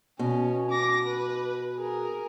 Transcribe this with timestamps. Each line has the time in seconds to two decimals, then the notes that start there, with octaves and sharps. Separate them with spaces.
0.19 B2 C#4
0.71 D6 A#6
1.05 B4
1.78 G#4 A#4